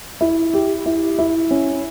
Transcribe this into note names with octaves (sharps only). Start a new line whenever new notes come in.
E4
G4
E4
E4
C#4